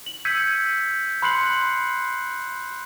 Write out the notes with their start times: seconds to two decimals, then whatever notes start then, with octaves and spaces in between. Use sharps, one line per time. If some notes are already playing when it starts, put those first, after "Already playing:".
0.06 F#7
0.25 E6 G6 G#6 B6 C#7 D#7
1.22 B5 C6 F#6 C7 C#7 F#7